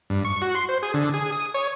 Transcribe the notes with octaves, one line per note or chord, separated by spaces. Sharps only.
G2
C#6
F#4
C6
C5
G#4
D3
G#4
D#6
C#5